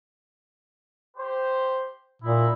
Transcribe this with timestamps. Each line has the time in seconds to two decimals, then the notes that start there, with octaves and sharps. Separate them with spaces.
1.17 G4 C5
2.22 A#2 D#4 E4